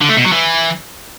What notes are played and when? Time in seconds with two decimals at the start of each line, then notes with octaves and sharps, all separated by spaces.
0.01 D3
0.09 A3
0.17 B2
0.24 F#3
0.32 E3